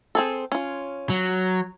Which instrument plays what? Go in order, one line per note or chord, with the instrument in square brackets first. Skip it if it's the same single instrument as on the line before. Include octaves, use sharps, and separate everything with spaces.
[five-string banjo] C4 G#4 A4
C#4 F4
[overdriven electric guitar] F#3